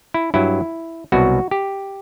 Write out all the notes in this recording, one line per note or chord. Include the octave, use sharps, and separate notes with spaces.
E4
G2 F#3 E4
C2 B2 F#3 F#4
G4